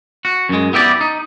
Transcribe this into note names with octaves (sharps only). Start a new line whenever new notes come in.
F#4
F#2 G#3
B3 E4 G4 D5
D#4